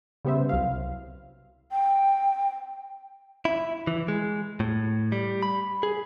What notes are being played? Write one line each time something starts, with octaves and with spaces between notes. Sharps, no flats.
C#3 G3 B3 C5 E5
C2 F#3 F5
G5
E4
E3
G#3
A2
G3
B5
G#4